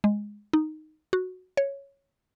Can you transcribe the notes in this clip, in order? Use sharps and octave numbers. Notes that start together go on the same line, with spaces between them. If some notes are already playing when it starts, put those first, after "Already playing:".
G#3
D#4
F#4
C#5